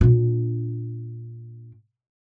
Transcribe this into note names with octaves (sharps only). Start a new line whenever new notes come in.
A#2 D4